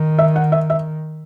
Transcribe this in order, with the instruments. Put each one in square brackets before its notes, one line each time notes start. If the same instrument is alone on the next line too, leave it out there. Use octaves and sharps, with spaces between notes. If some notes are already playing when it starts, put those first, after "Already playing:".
Already playing: [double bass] D#3
[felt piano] E5
F#5
E5
E5